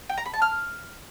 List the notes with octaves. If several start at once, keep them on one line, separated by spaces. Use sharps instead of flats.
G5
A#5
B5
A5
F6